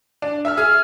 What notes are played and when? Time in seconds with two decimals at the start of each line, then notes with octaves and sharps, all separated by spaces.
0.22 D4
0.45 E5 E6 F6
0.57 G#4 F6